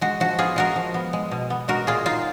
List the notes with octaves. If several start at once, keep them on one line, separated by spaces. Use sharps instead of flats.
G#3 F#4
F3 F#4
B3 F4 G#4
G#3 F#4 A#4
F3
B3
G#3
B2
B3
G#3 F#4 A#4
A#2 F4 G#4
D#4 F4